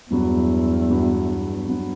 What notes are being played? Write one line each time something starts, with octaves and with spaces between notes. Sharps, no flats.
E2 G2 F#3 B3 F#4
G2 F#3 B3 F#4
G2 F#3 B3 F#4